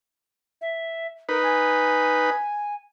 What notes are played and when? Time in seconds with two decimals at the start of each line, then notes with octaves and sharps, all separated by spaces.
0.61 E5
1.29 D#4 A#4 B4
1.43 G#5